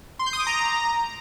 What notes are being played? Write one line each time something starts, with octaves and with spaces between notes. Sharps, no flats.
C6
G6
D#6
D6
A#5